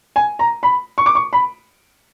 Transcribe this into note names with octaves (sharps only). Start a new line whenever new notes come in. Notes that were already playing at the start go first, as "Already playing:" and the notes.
G#5
A#5
B5
C#6
D6
C#6
B5